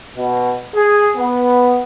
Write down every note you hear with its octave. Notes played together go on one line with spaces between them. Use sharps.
B2
G#4
B3